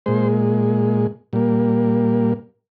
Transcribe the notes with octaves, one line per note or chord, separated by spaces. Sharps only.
A#2 G#3 C5
A#2 G3 A#3